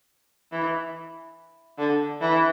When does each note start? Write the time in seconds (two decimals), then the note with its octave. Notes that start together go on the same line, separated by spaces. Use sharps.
0.52 E3
1.78 D3
2.21 E3